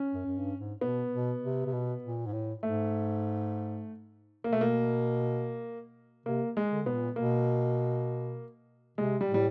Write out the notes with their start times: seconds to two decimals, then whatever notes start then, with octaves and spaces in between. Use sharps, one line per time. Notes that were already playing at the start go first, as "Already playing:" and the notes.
Already playing: C#4
0.14 F#2
0.26 F#2
0.37 G2
0.58 G#2
0.81 B2 B3
1.12 B2
1.42 C3
1.66 C3
1.73 B2
2.03 A#2
2.26 G#2
2.32 A2
2.63 G#2 A3
4.44 B2 A#3
4.52 A3
4.61 A#3
6.26 C3 A#3
6.57 G#3
6.71 D3
6.86 B2 B3
6.94 A#2
7.16 B2 A#3
8.98 C3 G#3
9.21 G3
9.29 A2
9.34 G3